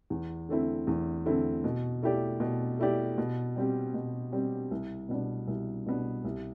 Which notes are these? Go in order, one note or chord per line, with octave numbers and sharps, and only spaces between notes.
E2
D3 A3 C4 E4
E2
D3 A3 C4 E4
B2
A3 E4 G4 D5
B2
A3 E4 G4 D5
B2
G3 C4 G4
B2
G3 C4 G4
C2
B2 B3 D4
C2
B2 B3 D4
C2